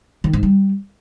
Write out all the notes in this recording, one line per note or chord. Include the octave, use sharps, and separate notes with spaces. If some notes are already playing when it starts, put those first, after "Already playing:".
D#3
G#2
G3